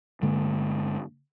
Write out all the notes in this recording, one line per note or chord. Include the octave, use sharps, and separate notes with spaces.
G2 D3 G#3 A#3